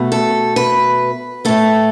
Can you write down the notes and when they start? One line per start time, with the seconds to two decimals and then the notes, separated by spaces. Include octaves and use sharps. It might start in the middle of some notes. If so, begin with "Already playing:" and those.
Already playing: B2 A3
0.12 A4
0.56 B4
1.45 A2 A3 A4